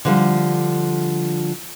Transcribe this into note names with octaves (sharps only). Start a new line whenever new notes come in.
D3 F3 G3